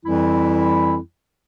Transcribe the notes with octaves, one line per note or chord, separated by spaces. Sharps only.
F2 E3 G3 E4